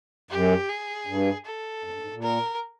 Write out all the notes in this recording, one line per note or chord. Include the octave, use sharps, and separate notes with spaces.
F#2 G4
G#4
G2
A4
F#2
G2
G#2
A#2
A#4